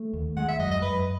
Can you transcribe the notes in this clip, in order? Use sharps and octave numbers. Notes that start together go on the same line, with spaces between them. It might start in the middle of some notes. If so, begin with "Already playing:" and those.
Already playing: A3
D#2
G#3 F#5
E5
F#2 D#5
D#5
F#2 B4